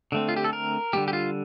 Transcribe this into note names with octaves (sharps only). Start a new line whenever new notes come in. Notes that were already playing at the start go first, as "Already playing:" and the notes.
D3 A3 C4
F4
G4
A4
A#4
D3 G3 A#3 G4
G4
F4